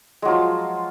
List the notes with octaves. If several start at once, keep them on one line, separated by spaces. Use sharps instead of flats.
F3 F#3 G#3 F4